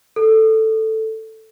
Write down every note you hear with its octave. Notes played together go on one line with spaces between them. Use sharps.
A4